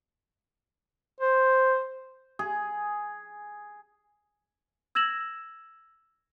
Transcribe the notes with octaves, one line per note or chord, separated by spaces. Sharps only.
C5
G#4
E6 G#6 A#6 E7 F#7